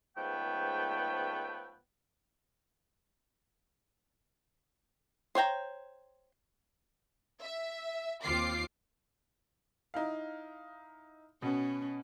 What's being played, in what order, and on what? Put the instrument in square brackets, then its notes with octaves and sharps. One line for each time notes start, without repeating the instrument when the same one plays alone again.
[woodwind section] C#2 G#2 F3 A3 B3 G5
[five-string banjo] C5 C#5 G5 A#5
[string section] E5
D#2 C4 F4 D6 C7
[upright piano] D#4 E4 F5
[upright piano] B2 B3 [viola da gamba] C#4